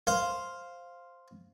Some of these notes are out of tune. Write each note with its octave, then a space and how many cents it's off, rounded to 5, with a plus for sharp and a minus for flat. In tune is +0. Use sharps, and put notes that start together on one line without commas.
C5 +0 F5 +0